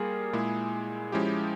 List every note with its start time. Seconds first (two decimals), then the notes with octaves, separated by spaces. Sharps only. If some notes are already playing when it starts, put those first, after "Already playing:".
Already playing: G3 A#3 F4 G#4 A#4
0.33 A#2 G#3 E4
1.12 F3 G#3 C#4 E4 G4